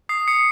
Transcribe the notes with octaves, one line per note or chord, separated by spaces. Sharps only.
D#6 C7
D#6 C#7